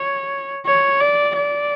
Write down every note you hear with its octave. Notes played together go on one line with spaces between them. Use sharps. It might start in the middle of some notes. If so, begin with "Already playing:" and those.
Already playing: C#5
C#5
D5
D5